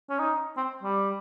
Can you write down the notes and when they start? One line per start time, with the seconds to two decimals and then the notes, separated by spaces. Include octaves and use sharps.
0.10 C#4
0.19 D#4
0.57 C4
0.83 G3